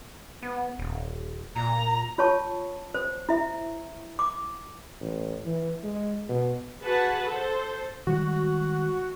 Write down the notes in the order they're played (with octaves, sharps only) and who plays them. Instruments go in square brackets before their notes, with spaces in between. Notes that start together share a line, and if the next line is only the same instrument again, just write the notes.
[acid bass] B3
D#1
[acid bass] A#2 [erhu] A#5
[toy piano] F4 C#5 A5 C#6
C5
E4 E5
D6
[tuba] A1
E3
G#3
B2
[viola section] F#4 G#4 B4 F#5 A5
A4 C5
[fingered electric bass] D#3 G3 G#3 [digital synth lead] F#4